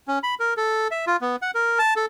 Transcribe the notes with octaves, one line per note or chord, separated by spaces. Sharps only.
C#4
B5
A#4
A4
E5
F4
B3
F#5
A#4
A5
A4